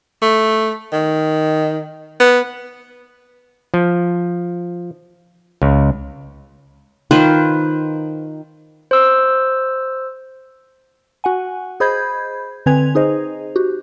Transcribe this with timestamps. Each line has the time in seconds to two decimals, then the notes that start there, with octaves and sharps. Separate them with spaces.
0.22 A3
0.93 D#3
2.20 B3
3.74 F3
5.62 C#2
7.11 D#3 F4 B4 C5
8.91 C5 E6
11.24 F#4 F#5 G#5
11.80 G#4 C5 D#5 B5 G6 G#6
12.66 D3 C4 B4 G#5 G#6 F7
12.95 D#4 G#4 C5 D#5
13.56 F#4 G4